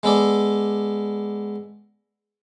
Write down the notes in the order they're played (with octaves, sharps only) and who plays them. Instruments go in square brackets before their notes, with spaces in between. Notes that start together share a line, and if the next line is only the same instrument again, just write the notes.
[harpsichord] G#3 B3 A4 D5